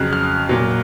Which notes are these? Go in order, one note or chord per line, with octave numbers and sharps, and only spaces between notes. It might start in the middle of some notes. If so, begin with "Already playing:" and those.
Already playing: F2 C#3 F#3 F6 F#6
F6
A#2 F#3